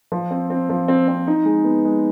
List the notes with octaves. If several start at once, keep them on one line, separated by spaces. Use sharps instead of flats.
F3
C4
C4
F3
C4
C4
D#4
G#3
B3
G#3